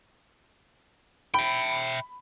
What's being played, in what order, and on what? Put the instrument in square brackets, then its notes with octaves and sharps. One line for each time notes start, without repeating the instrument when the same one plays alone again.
[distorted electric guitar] E5 G5 [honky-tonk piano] B5